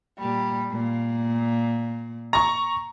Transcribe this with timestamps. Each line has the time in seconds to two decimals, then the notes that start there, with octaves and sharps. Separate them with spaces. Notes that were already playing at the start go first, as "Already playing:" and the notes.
0.18 A#2 G3
0.72 A#2
2.33 A#5 C#6